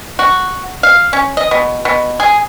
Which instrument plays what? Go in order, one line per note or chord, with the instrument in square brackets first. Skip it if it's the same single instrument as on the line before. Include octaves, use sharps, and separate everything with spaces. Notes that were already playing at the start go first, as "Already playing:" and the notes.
[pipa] F#4
F5
C#4
D#5
B2
B2
G#4